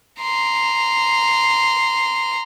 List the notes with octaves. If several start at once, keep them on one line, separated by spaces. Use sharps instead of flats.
A#5 C6